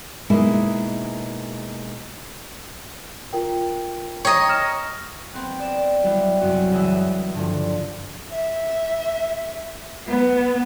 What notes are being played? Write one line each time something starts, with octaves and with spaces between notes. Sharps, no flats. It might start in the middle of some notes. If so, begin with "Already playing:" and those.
B2 G#3 A#3 D#4 E4 G#4
F4 A#4 G5
C#5 D#5 G5 A#5
F6 A#6 E7
B3 C4
D5 E7
F#3 G3 E4
C2 F#2 F#4 F#5
C#2 E3 C#4 G#4 D#6 E6
G2 D3 F3
E5
B3